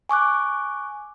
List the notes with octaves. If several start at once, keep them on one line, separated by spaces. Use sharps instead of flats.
G#5 C#6 D6 F#6